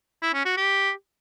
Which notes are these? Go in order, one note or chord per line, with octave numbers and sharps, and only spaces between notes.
E4
C#4
F#4
G4